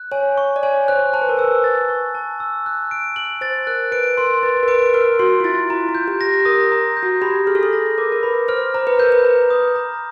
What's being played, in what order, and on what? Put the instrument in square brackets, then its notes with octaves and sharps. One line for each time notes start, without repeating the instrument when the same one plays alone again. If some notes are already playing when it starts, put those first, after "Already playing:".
Already playing: [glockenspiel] F#6
[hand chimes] C#5 [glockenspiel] G#5
[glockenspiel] C#6
[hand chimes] D5
[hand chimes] C#5 [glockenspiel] G#5
[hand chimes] C5 [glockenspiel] F#6
[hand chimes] C5 [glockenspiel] A5
[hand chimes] B4
A#4
[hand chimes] B4 [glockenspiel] E6
[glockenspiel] A6
C#6
A5
E6
F#6
D7
F#7
[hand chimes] C5 [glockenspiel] A6
[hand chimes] A#4 [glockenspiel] F#6
[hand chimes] B4 [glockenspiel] D7
[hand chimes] A#4 [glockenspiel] C6
[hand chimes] B4 [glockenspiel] A6
[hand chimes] A#4
[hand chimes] B4 [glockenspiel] D7
[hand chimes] A#4 [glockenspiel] F6
[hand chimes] F#4 [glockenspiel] C6
[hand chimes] F4
[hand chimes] E4 [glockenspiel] A6
[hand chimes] F4 [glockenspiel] A#5
[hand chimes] F4
[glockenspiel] G6
[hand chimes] G4
[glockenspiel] A#6
[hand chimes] G4
[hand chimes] A#4 [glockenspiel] D#6
[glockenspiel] A#5
G6
[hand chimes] F#4
[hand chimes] G4 [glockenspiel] B5
[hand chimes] G#4 [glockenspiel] F6
[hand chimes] A4
G#4
[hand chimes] A4 [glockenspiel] A#6
[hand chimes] A#4 [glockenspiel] D6
[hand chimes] A#4
[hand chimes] B4 [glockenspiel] B5
[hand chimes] C5 [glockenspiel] F6
[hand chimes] C5 [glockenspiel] A#5
[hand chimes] B4
[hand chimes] A#4 [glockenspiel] G6
[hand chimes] B4
[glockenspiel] A#5
D#6
A#5